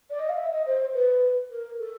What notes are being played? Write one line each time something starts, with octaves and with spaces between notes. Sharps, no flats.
D5
D#5
F5
E5
D#5
C5
B4
A#4
A4